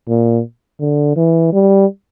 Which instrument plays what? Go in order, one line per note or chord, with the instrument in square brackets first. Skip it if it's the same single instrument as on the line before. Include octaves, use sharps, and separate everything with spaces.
[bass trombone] A#2
D3
E3
G3